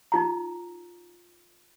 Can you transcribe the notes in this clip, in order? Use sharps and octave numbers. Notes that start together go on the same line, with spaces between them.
D#4 F4 A#5